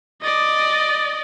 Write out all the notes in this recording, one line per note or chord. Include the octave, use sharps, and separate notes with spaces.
D5 D#5